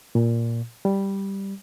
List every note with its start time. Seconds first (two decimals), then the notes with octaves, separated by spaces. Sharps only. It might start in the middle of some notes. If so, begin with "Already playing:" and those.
0.15 A#2
0.85 G3